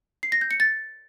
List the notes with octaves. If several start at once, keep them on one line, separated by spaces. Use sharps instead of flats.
C7
A#6
G6
C#7
A6